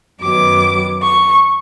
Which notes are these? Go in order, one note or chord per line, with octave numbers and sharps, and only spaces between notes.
F#2 D#3 F#3 B3 D6
C#6